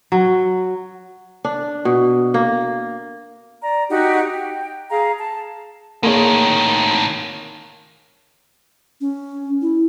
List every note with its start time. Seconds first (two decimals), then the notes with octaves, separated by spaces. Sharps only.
0.12 F#3
1.44 D4
1.85 B2
2.34 A#3
3.62 D5 A#5
3.90 D#4 F#4 G4 F#5
4.31 G5
4.91 G#4 F5 A#5
5.19 A5
6.03 A2 D#3 A#3 G#4 C#5
9.01 C#4
9.61 E4